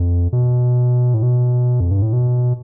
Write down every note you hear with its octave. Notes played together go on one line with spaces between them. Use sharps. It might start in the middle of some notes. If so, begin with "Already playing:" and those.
Already playing: F2
B2
A2
B2
F2
G2
A2
B2